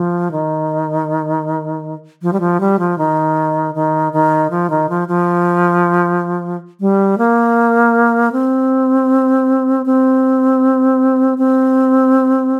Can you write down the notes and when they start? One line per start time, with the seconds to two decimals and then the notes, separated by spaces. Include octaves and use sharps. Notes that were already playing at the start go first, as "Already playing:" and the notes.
Already playing: F3
0.31 D#3
2.22 F3
2.33 G3
2.40 F3
2.60 G3
2.79 F3
2.98 D#3
3.75 D#3
4.13 D#3
4.50 F3
4.70 D#3
4.89 F3
5.08 F3
6.81 G3
7.18 A#3
8.32 C4
9.86 C4
11.38 C4